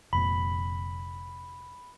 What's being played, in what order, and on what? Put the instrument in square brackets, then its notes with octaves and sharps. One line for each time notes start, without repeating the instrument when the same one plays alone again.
[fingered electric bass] F1 F2 A#2 [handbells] B5